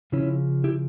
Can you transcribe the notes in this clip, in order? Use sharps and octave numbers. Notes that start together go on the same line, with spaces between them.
C#3 F3 C#4 E4
E4 G4